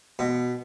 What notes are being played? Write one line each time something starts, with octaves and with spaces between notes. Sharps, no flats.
B2